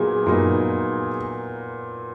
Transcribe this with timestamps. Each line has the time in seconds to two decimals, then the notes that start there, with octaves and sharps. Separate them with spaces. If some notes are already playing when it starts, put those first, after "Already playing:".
Already playing: A#2 F#3 B3 D#4 G#4
0.27 A#2 F#3 B3 D#4